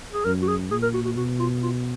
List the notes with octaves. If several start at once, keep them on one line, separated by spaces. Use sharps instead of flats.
G#4
F#2 A#4
F#4
G#4
A#2 G#4
A#4
F#4
F#4
B2 F#4
F4
F4